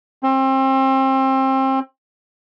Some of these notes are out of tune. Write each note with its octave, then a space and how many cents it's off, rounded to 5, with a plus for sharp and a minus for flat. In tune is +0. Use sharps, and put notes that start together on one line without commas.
C4 +30